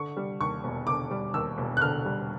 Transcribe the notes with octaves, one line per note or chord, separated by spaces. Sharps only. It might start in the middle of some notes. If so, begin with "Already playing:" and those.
Already playing: D3 C#6
G3
D#2 C#6
E1
D3 D6
G3
D#2 E6
E1
F#6
D3 F6
G3